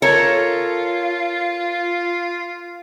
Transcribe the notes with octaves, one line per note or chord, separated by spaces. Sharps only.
F4 A4 A#4 C#5